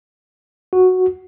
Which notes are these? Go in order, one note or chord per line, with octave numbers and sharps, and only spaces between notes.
F#4